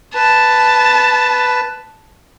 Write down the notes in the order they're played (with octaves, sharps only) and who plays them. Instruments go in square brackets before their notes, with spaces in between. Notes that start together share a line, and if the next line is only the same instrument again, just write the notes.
[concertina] B4 [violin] A5